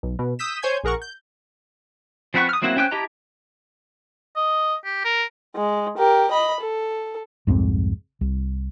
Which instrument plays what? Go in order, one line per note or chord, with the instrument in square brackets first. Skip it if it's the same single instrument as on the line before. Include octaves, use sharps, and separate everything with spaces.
[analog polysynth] B1
B2
D#6 E6 G6 B6 E7
C5 C#5 G#5 G6 G#6
A#1 G#4 A#4 F#5 C#6
G6
[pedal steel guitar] F3 C4 B4 F#5 C#6
D#6 F6
F#3 A#3 C4 E4 F#4
C#4 C5 G5 D6 F#6
E4 G4 D#5 A5 A#5
[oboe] D#5
G4
A#4
[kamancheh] G#3
G4 A#4
D#5 B5
A4
[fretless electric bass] C2 F2 G#2 C4
C2